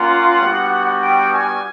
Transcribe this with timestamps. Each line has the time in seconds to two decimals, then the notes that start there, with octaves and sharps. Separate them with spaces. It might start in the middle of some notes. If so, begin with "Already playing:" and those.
Already playing: A#3 C#4 F4 F#5
0.40 G3 B3 D4 F#4
1.00 G5
1.31 G#5